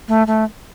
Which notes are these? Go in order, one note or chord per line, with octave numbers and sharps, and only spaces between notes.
A3
A3